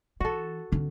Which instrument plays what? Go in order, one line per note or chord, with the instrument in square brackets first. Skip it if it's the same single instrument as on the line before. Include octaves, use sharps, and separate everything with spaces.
[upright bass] E3 [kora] F#4 A4
[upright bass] D3 C4